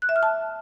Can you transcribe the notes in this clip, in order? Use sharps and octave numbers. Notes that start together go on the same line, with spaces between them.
F#6
E5
F6
A5